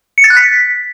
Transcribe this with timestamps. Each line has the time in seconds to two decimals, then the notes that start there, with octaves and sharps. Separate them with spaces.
0.18 C#7
0.24 A6
0.30 F#6
0.37 B6